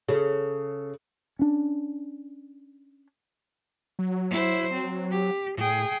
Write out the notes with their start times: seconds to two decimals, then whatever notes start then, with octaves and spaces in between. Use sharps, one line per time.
0.08 C#3 A4
1.39 C#4 D4
3.99 F#3
4.30 E4 C5
4.74 C4
5.11 G4
5.58 A2 G#4 G5